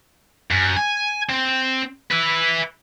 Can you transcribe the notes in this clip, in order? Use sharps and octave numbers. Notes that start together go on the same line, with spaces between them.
F#2
G#5
C4
B4 E5